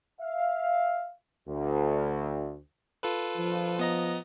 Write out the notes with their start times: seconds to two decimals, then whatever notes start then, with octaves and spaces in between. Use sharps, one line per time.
0.20 E5 F5
1.49 D2
3.03 F4 A4 B4
3.37 F3
3.79 B3 D#5 A#5